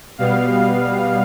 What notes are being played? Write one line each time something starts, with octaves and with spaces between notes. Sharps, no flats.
B2 G3 B3 F5